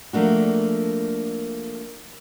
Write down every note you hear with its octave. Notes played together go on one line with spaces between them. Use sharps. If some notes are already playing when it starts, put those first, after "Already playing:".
F3 A3 A#3 D4 F#4